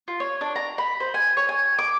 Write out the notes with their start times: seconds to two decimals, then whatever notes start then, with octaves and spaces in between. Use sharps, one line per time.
0.08 F4
0.20 C#5
0.41 D4
0.56 A#5
0.78 B5
1.00 C5
1.14 G#5
1.37 C#5
1.49 G#5
1.78 D6